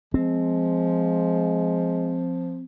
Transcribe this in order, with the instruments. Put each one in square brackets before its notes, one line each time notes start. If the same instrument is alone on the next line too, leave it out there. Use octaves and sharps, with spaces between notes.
[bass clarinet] F3 [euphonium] G#3 [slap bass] C4